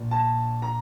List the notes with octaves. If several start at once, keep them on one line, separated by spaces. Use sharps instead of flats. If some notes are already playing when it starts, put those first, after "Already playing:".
Already playing: A#1 A#2
A5
A#5